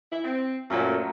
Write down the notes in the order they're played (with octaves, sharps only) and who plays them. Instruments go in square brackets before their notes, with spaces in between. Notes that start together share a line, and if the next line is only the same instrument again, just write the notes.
[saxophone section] E4
C4
[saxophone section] F#2 A#2 [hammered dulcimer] F3 F#3 A3